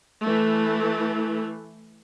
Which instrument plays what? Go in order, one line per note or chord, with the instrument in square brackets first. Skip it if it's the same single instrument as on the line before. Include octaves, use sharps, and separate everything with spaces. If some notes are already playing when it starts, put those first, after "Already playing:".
[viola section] E3 A3